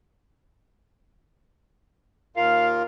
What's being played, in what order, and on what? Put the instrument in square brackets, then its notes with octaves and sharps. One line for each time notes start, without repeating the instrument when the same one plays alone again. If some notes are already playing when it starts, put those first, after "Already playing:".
[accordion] D#2 F4 A#4 [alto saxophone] F5